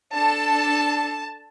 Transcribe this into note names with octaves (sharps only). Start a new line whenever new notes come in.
D4 A4 A5